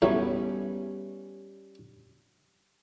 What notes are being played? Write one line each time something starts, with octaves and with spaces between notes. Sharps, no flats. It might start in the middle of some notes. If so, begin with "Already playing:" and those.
E2 F#3 G3 A3 B3 C#4